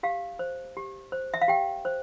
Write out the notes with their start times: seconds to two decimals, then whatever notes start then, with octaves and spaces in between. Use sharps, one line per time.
0.03 G4 F5
0.39 C5
0.77 G4
1.12 C5
1.34 E5
1.42 F5
1.48 G4 G5
1.85 C5